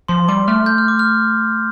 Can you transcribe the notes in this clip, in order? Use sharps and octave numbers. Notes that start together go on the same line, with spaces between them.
F3 C6
G3 D6
A3 F6
G6
F6
D6
F6